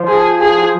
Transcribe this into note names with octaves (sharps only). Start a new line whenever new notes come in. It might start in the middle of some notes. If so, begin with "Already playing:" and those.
Already playing: F3
G#4
G#4